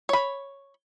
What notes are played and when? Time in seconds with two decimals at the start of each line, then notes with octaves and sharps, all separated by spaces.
0.09 C#5 B5